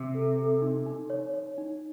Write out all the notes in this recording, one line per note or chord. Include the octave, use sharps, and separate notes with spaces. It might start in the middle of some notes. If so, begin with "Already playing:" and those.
Already playing: C3
A4
A4
D#4
D#4
C#5
C#5
D#4